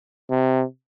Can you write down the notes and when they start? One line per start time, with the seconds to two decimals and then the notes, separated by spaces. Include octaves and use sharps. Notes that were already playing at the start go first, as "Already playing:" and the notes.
0.30 C3